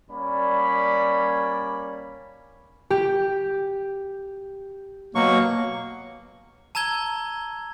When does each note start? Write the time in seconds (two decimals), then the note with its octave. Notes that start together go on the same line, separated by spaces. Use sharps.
0.10 G3 A#3 C#4 D5 B5
2.90 G4
5.15 B2 F#3 A#3 C#6
6.75 A5 A#5 E6 G#6 G7